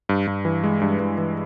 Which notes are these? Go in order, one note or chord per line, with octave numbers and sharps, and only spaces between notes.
G2
G2
E3
G#3
G2
G2
E3